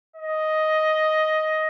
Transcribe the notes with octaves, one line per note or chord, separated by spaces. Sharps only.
D#5